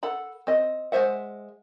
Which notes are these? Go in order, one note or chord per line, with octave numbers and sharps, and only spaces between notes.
A4 F#5 B5
C4 D#5
G#3 F4 C5 E5 F#5